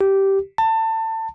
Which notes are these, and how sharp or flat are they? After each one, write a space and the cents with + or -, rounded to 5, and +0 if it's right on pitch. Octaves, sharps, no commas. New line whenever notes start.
G4 -10
A5 +25